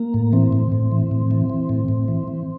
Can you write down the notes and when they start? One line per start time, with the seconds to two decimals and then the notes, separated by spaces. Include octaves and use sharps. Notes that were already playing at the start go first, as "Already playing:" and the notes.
Already playing: A#3
0.14 A2
0.33 E3 C4
0.52 A2
0.72 A2
0.91 E3
1.11 A2
1.31 E3
1.50 E3
1.69 A2
1.88 A2
2.08 E3
2.28 E3